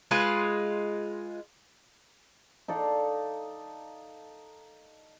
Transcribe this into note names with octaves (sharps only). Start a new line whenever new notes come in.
G#3 F4 B4
D#4 A4 D5 F5